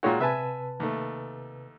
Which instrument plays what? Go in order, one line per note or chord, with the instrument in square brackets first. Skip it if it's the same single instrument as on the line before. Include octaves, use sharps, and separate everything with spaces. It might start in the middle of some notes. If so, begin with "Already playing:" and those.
[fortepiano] A#2 G#3 F#4 [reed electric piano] F4 C#5 G5
[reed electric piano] C3 B4 A5 [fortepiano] E5 G#5
[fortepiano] D#2 A3